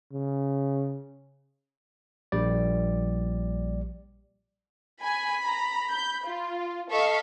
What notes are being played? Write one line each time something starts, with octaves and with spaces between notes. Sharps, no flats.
C#3
A#1 G3 D5
G#5 B5
A#5
G6
F4
A4 D#5 F5 C#6 B6